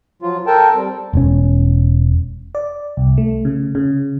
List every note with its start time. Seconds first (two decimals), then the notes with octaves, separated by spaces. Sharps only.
0.22 F3 F#3 F4
0.47 A4 A#4 G5 A5
0.75 G3 C4
1.13 E1 C#4
2.55 D5
2.97 C2
3.18 A3
3.45 C#3
3.75 C#3